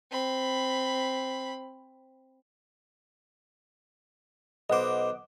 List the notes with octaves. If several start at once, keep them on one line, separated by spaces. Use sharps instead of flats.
C4 B5
B1 C5 D#5 F#5 D6